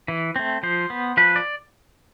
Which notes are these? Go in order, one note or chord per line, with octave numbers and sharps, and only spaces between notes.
E3
A3 C4
F3 C5
B3
F3 B4
D5